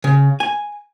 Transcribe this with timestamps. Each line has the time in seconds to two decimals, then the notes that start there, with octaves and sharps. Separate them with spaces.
0.04 C#3
0.40 G#5